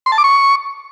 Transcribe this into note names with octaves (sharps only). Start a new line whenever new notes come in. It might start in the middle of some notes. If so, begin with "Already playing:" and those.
C6
A5
D6
C#6